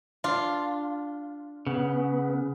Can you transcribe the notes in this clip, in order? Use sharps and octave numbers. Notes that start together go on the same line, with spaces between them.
D4 F4
C#3 B3